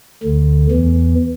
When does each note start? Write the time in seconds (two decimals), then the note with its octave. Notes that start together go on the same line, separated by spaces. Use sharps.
0.23 D2 D3
0.72 E2 E3